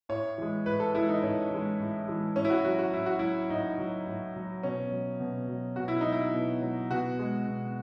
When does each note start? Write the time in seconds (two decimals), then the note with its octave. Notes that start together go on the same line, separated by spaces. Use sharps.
0.09 A2 C#5
0.38 E3 G#3
0.66 A2 B4
0.80 A4
0.95 E3 G#3 E4
1.09 D#4
1.23 A2 C#4
1.51 E3 G#3
1.80 A2
2.08 E3 G#3
2.36 A2 C#4
2.45 E4
2.50 F#4
2.64 F#3 F#4
2.79 F#4
2.93 A2 E4
3.06 F#4
3.19 F#3 E4
3.50 A2 D#4
3.78 F#3
4.07 A2
4.35 F#3
4.63 B2 C#4
4.91 F#3
5.20 B2
5.48 F#3
5.76 B2 F#4
5.88 E4
6.01 F#3 D#4
6.12 E4
6.33 B2
6.61 F#3
6.91 B2 F#4
7.19 G#3
7.47 B2